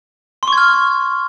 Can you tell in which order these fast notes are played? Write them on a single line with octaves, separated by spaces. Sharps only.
C6 C#6 G#6 F6